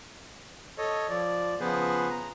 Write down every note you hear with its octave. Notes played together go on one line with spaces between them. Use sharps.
A4 C#5 D#5
F3 D5
C#3 F3 B3 G#4 B4 C5
A#5